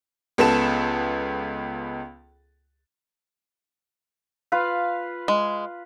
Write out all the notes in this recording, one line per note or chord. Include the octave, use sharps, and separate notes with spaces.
C#2 B3 A4 E7
F4 B4 F5
G#3